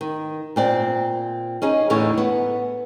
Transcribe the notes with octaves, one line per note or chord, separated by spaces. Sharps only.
D#3
A#2 C4 D5
C#4 D#4 G#4
E2 A2 D3 D#4 C#5
B3